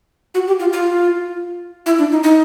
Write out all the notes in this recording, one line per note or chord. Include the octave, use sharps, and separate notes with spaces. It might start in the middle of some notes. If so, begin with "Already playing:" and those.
F#4
G4
F4
F4
E4
D4
D#4
D#4